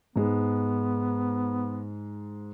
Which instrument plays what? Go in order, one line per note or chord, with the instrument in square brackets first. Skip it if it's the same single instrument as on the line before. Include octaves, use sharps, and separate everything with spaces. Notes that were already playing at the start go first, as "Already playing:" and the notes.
[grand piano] G#2 G#3 [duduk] B3